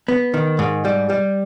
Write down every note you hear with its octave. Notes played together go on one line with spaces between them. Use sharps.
B3
D#3
G#2
G3
G3